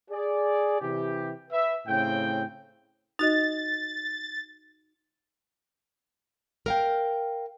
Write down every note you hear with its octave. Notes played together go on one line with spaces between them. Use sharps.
G#4 D5
C3 E3 G4
B4 E5
A2 C#3 C4 G5
D#4 F#4 D#5 A6
A#4 F5 G5